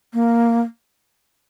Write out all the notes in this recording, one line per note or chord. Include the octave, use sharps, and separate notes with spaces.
A#3